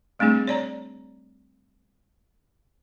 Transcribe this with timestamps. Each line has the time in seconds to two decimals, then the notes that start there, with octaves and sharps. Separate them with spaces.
0.19 G3 A3 C4 D4 G#4
0.47 C#5 D5 A#5